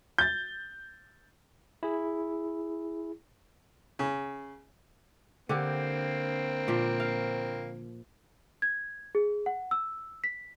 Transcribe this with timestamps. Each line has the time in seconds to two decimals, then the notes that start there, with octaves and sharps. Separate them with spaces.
0.18 G6 A6
1.83 E4 G#4
3.99 C#3
5.49 D3 A#3 C4 G4
6.68 A#2 F3
7.00 F5
8.62 G#6
9.15 G#4
9.46 F#5
9.71 E6
10.24 B6